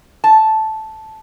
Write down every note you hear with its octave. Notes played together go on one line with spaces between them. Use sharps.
A5